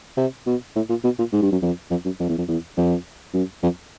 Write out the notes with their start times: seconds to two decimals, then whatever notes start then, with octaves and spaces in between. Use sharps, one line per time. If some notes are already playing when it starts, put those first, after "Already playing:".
0.17 C3
0.47 B2
0.76 A2
0.89 A#2
1.04 B2
1.19 A#2
1.33 G#2
1.42 G2
1.52 F#2
1.62 F2
1.91 F2
2.05 F#2
2.20 F2
2.29 E2
2.38 F2
2.48 E2
2.77 F2
3.34 F#2
3.63 F2